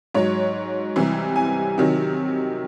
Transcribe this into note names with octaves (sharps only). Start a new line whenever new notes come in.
G#2 F#3 C#5
C2 C3 E3
G#5
C3 D#3 F#3